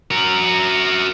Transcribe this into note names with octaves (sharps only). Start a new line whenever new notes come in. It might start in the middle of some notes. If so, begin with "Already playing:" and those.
F#4 A#4